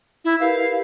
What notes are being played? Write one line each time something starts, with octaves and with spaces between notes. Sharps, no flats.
E4
G4 A#4 B4 F5